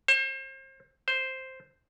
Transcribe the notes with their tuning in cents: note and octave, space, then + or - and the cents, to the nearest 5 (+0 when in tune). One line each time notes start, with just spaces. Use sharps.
C5 +35
C5 +0